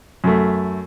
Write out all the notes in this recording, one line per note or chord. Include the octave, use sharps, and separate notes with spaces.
F#2 A3